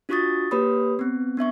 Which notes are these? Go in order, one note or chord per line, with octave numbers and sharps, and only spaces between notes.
D4 F4 F#4 C#6 D#6 A6
A#3 G4 B4 C#5 B5 D#6
B3 C4
B3 D4 E5 C#6